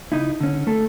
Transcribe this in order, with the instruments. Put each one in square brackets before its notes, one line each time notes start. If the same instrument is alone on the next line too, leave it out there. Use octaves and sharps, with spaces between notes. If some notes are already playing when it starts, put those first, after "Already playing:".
[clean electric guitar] C#2 D#4 E4
D3 C#4
A3 A4